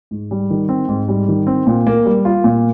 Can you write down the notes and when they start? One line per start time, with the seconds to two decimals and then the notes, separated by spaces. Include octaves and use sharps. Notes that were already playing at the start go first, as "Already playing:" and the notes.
0.11 G#2
0.31 G3
0.50 D#3
0.69 C4
0.88 G#2
1.08 G3
1.28 D#3
1.47 C4
1.67 A#2
1.87 A#3
2.05 G3
2.25 F4
2.44 A#2